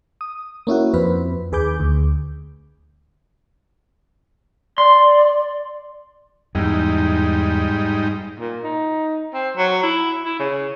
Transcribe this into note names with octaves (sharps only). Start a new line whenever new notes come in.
D#6
A#3 C#4 E4 F#4
F2 C4 B4
D#2 G#4 B4 D6 G6
D2
D5 C6
E2 G#2 G3 D#4
A#2
D#4
C4
F#3
E4
E4
C#3